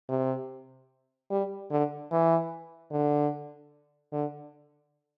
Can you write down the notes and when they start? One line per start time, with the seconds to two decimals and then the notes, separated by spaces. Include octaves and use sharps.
0.09 C3
1.31 G3
1.71 D3
2.11 E3
2.92 D3
4.13 D3